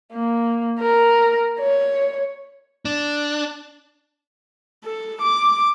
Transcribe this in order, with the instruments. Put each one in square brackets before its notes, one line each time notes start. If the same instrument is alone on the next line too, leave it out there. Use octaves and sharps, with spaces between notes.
[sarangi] A#3
A#4
C#5
[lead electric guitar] D4
[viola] A4
D6